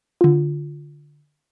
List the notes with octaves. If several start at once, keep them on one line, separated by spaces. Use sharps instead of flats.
D3 F4